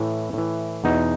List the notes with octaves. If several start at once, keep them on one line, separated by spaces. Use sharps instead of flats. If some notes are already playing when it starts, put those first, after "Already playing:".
Already playing: A2 E3
A2 E3
E2 B2 D#4